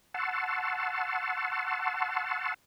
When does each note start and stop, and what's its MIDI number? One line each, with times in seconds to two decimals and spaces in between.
0.14 2.54 78
0.14 2.54 81
0.14 2.54 84
0.14 2.54 85
0.14 2.54 88